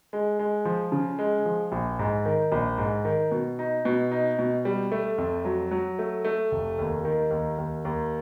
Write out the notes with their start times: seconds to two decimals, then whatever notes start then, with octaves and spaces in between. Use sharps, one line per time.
0.13 G#3
0.39 G#3
0.65 F3
0.92 C#3
1.19 G#3
1.46 F3
1.72 A#1
1.99 G#2
2.25 D#3
2.52 A#1
2.78 G#2
3.05 D#3
3.31 B2
3.59 D#4
3.85 B2
4.12 D#4
4.39 B2
4.65 G3
4.92 A3
5.18 F2
5.45 F#3
5.71 F#3
5.99 A3
6.25 A3
6.52 F1
6.79 D#2
7.05 D#3
7.31 D#2
7.58 D#2
7.85 D#2